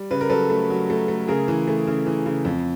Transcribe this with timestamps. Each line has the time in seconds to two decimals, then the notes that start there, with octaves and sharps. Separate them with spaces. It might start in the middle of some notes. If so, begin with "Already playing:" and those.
Already playing: G3
0.11 C#3 B4
0.21 A#4
0.30 F#3 A4 B4
0.50 A3
0.70 F#3
0.90 A3
1.08 A3
1.28 C#3 G#4 A#4
1.48 E3
1.67 A3
1.87 C#3
2.07 E3
2.26 C#3
2.45 F2